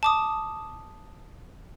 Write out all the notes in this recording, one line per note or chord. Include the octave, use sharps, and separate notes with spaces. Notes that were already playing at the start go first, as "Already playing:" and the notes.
A5 D6 D#6